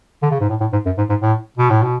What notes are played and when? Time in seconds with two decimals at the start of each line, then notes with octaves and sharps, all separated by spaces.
0.22 D3
0.31 C#3
0.40 G#2
0.49 A2
0.60 A2
0.72 G#2
0.86 F#2
0.98 G#2
1.09 G#2
1.22 A2
1.58 B2
1.70 A2
1.83 B2